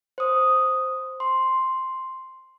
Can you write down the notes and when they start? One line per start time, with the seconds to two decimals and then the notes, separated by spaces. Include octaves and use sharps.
0.18 C5 D#6
1.20 C6